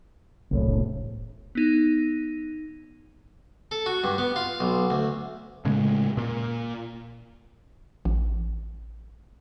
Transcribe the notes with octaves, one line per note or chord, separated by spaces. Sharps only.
F#1 C2 A2
E1
B3 D#4
A4
F#4
G2
B3
F4
B1
D2
A2 C#3 G#3
A#2
A1